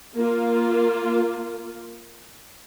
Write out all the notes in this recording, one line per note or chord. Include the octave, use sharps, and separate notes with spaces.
A#3 F4